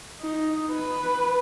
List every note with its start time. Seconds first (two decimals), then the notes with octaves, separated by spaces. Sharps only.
0.21 D#4
0.71 B4